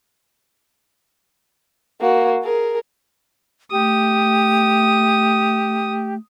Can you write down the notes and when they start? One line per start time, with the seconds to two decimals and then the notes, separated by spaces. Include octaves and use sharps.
2.01 A#3 F#4
2.42 G#4 A#4
3.71 A3 G4 D#6